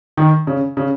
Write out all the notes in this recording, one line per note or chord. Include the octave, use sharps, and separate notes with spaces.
D#3
C#3
C#3